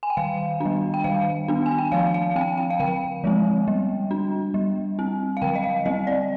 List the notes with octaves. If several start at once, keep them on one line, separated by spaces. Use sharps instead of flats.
G#5
G5
D#3 F5
G3 D4
G5
D#3 F5
B3 D4
G#5
G5
F3 F5
F5
C4 G5
G5
F5
D3 G5
F3 G#3 C4
G3
D4
G3
C4
F5
D3 G5
D#5
F5
G3 C4 D#5
D5